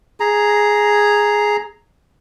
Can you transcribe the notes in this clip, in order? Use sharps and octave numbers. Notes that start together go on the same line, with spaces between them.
G#4 A#5